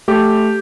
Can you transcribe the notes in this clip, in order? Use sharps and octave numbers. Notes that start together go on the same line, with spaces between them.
A3 G4